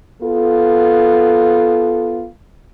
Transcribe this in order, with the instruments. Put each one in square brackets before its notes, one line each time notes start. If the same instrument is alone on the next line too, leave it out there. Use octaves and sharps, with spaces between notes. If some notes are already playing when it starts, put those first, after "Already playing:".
[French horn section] B3 F4 A4